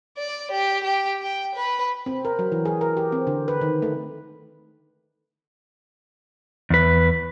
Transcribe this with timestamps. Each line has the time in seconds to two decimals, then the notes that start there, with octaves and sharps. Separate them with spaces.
0.18 D5
0.51 G4
0.84 G4
1.22 G5
1.55 B4
2.06 C4
2.25 A#4
2.39 F#3
2.52 E3
2.65 G#4
2.81 A#4
2.97 G4
3.12 C4
3.27 D3
3.48 B4
3.61 D#3
3.82 A3
6.70 E2 B4